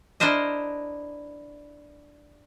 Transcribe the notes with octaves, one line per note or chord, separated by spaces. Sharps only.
D4 E4 A#4 C5 D#5